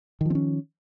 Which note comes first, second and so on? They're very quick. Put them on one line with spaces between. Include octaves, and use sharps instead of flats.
D#3 F3 C4 C#4